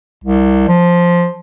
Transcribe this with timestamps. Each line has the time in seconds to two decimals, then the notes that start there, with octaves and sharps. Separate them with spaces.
0.24 C2
0.68 F3